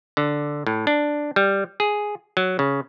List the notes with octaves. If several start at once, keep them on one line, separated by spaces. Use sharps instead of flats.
D3
A2
D4
G3
G#4
F#3
C#3